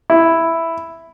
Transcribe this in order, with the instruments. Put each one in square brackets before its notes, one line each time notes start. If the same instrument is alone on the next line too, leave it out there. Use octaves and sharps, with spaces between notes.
[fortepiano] E4